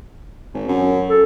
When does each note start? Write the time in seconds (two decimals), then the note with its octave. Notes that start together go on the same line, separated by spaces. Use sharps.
0.54 G#1
0.68 F#2
1.09 A4